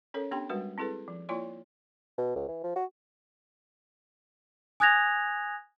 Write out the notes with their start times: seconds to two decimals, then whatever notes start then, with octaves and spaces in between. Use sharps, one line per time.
0.14 C#4 A4 A#4 C#5
0.31 B3 D4 G4 G5 C6
0.49 G3 G#3 F#4 A#4 B4
0.78 C4 E4 G#4 A4 B4
1.08 F3
1.29 A#3 E4 F4 C#5 D5 C6
2.18 B2
2.35 C#2
2.48 E3
2.64 F3
2.76 F#4
4.80 G#5 D#6 F#6 G#6 A#6 F7